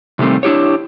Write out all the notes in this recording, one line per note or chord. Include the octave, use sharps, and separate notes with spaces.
C3 D#3 G3 A3 C4
D4 E4 G4 C#5